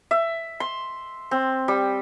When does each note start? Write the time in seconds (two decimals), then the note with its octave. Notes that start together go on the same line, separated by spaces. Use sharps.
0.11 E5
0.60 C6
1.31 C4
1.68 G3